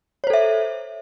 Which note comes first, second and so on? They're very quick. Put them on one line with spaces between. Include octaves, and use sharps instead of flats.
C#5 C5 A4 E5